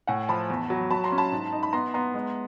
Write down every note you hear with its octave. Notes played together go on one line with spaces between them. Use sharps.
A2 F#5 G#5
F3 A5 B5
E2
F#3
F#3 A5 B5
A#5 C6
C#4
A5 B5
G#2
D#4
B5
B3 A#5 C6
B3 A#5 C6
G#3